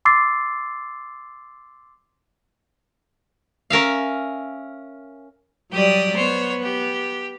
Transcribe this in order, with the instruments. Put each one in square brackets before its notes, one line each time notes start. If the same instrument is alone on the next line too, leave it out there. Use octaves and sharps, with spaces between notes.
[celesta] C6 D6 E6 A6 C7
[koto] C#4 A#4 E5 F5
[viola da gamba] F#3 G3 D5 [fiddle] G4 D#6
[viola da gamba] B3 [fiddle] C5 C#5
[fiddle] G4